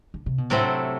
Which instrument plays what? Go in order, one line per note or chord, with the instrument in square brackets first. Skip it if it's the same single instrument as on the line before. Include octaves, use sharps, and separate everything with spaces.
[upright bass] D3
C3
B2
[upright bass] A2 [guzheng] C3 F#3 A3 C4 E4